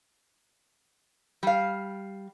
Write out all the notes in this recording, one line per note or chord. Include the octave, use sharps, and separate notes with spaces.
G3 F5